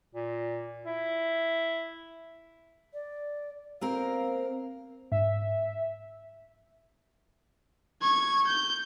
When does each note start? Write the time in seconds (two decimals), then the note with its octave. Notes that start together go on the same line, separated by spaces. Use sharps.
0.15 A#2
0.85 E4
2.93 D5
3.81 A#3 C4 A#4 F5
5.12 G#2 E5
8.02 C#6 G#6
8.47 G6